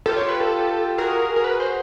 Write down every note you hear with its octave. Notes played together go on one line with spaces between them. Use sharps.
F4 G4 A4
C#5
B4
A4
F#4 G#4 A#4
A#4
B4
C5